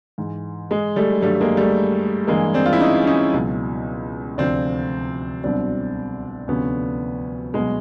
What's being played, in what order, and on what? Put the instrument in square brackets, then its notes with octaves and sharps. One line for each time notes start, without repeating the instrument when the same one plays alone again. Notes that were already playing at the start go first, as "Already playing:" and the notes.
[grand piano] G#2 E3
G#3
G3 A3
G2 D#3 F#3 G3 A3
G#3 A#3
G3 A3
G2 E3 G#3 A#3
C4 D4
F4
E4
C#4 D#4
C#4 D#4
C#2 B2 F#3
D2 C3 F3 C4 D4
C2 B2 F#3 C4 D4
D2 C3 F3 B3 C#4
C2 B2 F#3 G#3